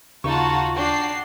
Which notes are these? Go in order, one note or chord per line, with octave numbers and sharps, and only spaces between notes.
D#2 C#3 D#4 F4 F#4 A5 C#6
D4 F#4 G5 C7